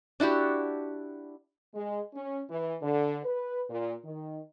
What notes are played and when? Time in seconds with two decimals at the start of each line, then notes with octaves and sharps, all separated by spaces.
0.20 D4 E4 F#4 G4
1.75 G#3
2.14 C#4
2.49 E3
2.82 D3
3.24 B4
3.69 A#2
4.05 D#3